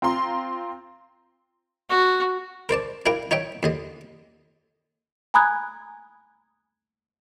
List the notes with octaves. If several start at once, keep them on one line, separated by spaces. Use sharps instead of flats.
C4 F4 A#5 C6
F#4
A#4 C5 D5 A5
D4 E4 A#4 F5 G5
D#4 C#5 E5 G5
D#2 D3 D#5
G#5 A#5 B5 D#6 F#6 G#6